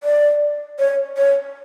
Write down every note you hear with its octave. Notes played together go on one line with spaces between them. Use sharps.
D5
C#5
C#5